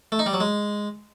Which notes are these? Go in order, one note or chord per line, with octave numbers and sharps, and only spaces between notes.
A3
D#4
G3
F#3
G#3